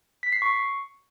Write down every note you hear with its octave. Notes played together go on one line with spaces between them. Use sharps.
B6
C7
C#6